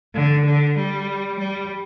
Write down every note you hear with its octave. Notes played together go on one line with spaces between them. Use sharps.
D3
D3
G3
G3